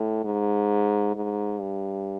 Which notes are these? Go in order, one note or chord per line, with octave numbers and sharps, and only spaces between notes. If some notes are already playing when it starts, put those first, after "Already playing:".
Already playing: A2
G#2
G#2
G2